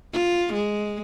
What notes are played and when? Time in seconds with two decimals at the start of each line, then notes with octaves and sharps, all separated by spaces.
0.13 F4
0.53 G#3